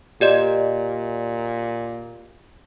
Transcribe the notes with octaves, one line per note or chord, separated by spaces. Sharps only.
A#2 G4 D5 D#5